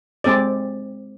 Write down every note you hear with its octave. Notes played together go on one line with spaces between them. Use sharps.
G#3 C4 A4 D5